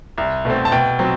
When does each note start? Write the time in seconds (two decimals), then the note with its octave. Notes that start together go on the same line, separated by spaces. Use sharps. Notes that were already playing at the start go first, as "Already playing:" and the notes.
0.18 C2
0.45 B2 A3 C4
0.65 A5
0.72 B2 G5
0.99 F#3 C4